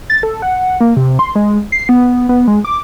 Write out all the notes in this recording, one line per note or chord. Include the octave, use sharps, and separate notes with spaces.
A6
A4
F#5
A#3
C3
C6
G#3
C7
B3
B3
G#3
D6